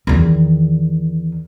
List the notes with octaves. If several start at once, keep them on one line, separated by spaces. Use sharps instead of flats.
E2 D#3